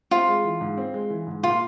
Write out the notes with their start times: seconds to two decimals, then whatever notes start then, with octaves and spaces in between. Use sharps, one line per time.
0.11 C4 F4
0.28 G#3
0.44 E3
0.61 G#2
0.77 C4
0.94 G#3
1.10 E3
1.27 G#2
1.43 A#2 F4